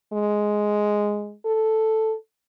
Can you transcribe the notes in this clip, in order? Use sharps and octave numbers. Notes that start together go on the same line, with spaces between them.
G#3
A4